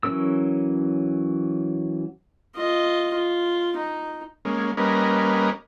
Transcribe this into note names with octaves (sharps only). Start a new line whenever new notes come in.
E3 F#3 C#4 A#4 E6
F4 D#5
F4
D#4
G#3 A#3 C#4
G3 A#3 C#4 A#4 B4 D#5